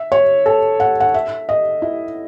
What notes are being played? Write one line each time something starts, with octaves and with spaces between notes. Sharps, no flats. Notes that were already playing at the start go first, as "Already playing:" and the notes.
Already playing: E5
C#5
A4
F#5
F#5
E5
D#5
E4